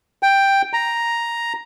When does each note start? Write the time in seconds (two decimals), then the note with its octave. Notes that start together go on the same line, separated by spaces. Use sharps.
0.23 G5
0.73 A#5